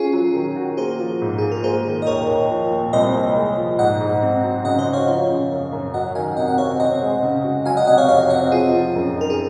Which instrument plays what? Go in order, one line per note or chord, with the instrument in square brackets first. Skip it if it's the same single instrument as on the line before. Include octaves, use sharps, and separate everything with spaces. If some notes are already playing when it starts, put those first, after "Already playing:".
Already playing: [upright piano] C#4 [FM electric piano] F4 G#4
[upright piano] F#3
D#3
F#4
[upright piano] A#3 [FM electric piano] G#4 C5
[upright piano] F3
G#2
[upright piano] F4 [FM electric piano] G#4
[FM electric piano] A#4
[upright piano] A#3 [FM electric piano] G#4 C5
[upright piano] D#3
[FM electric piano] D#5
[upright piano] D#2 [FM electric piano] A#4 C#5
[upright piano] D#2
F3
A#2
[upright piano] C2 [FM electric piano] C5 D#5
[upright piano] A#3
G#3
F3
[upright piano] G#2 [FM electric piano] D#5 F#5
[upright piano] G#2
C4
F#3
[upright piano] C#3 [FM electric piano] D#5 F#5
[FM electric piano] C5 D#5
[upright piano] F#4
[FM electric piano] C#5 F5
[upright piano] F3
C#3
F#2
F#2
[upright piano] F#3 [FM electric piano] D#5 F#5
[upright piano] D#3 [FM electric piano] F5 G#5
[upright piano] C3 [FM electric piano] D#5 F#5
[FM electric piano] F#5
[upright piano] C4 [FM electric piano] C#5 F5
[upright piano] C4 [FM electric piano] D#5 F#5
[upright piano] G#3
C#3
F#4
[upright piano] F#3 [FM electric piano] F5 G#5
[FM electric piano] D#5 F#5
[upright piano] C3 [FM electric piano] D#5 F#5
[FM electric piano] C#5 F5
[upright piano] F2 [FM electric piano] C#5 F5
[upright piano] C4 [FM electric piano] D#5 F#5
[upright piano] C4 [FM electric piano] F4 G#4
[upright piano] F3
F#2
[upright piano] D#4 [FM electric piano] A#4
[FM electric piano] G#4